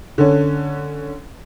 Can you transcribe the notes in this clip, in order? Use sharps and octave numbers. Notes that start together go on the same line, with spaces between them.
D3 C#4